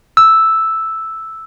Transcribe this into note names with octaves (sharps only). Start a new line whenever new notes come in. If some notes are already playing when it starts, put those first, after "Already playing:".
E6